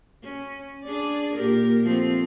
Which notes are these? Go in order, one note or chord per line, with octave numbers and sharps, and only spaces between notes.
C#4
D4 G#4 D5
A#2 G4 A#4
F3 A3 C4